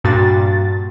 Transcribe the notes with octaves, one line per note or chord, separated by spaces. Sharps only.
G2 A#2 F#4 A6